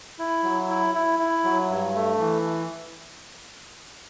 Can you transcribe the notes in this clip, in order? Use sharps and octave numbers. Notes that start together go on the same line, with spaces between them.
E4
F#3
E4
E4
E4
F#3
G2
A3
E3